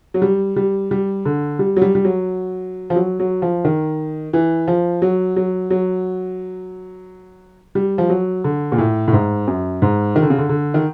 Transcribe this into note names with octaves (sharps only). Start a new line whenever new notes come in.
F#3
G3
G3
G3
D3
G3
F#3
G3
G3
F#3
F3
F#3
F#3
F3
D#3
E3
F3
F#3
F#3
F#3
G3
F3
F#3
D3
A#2
A2
A2
G#2
F#2
G#2
D#3
D3
C#3
D3
D3
D#3